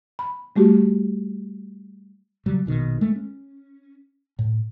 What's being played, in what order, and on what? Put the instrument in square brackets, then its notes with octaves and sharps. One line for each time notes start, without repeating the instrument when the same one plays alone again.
[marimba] B5
G3 A3 F#4 G4
[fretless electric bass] C#3 F#3 G3
A#1 B2 D#3
G#3 A3
C#4
A2